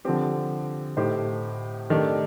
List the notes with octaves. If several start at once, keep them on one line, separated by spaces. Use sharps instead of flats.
D3 F3 C4 G4
A2 A3 D#4 G4 C5
D#3 A3 D4 G4